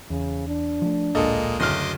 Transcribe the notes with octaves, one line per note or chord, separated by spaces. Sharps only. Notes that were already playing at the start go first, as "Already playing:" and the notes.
E2 C#3
D4
F3 A3
D1 A#1 A#2 G#3 A#3 A4 D#5
F#1 D2 D#5 C6 D6 F6